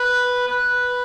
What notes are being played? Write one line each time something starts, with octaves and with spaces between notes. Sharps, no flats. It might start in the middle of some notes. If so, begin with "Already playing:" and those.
Already playing: B4
B4